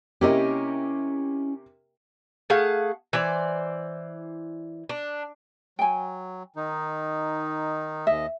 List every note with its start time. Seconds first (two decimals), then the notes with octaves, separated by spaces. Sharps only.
0.21 C3 A#3 C#4 E4 G4 D#5
2.50 A3 G#4 F5 F#5
3.13 E3 C5 D5
4.89 D4
5.79 F#3 G5 G#5
6.56 D#3 D#4
8.07 D#2 D#5 E5